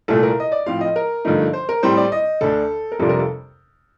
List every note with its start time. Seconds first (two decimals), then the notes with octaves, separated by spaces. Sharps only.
0.08 C2 A#2 A3 A4
0.23 A#4
0.40 D#5
0.52 D5
0.66 A2 F3 C4 F4 F5
0.81 D#5
0.96 A#4
1.25 G2 D3 F3 A3 D#4
1.53 C5
1.69 A#4
1.83 A2 G3 C4 C5
1.97 D5
2.12 D#5
2.41 D2 D3 A3 D4 A4
2.92 A#4
2.99 F2 C3 G3 D4 F4 A4
3.09 A#4
3.19 A4